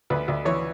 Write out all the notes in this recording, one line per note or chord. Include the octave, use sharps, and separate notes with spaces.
D2 B4
D2
E3 C#5